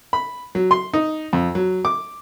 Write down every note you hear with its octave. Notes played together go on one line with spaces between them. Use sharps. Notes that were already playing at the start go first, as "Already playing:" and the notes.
B5
F#3
C6
D#4
F2
F#3
D6